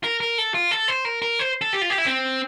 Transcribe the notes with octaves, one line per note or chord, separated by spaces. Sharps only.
A#4
A#4
A4
F4
A4
C5
A#4
A#4
C5
A4
G4
F4
G4
E4
C4